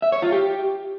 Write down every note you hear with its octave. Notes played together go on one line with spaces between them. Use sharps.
E5
C#5
F4
G4